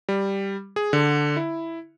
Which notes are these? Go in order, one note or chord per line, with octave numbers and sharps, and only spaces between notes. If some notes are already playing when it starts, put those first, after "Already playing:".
G3
G#4
D3
E4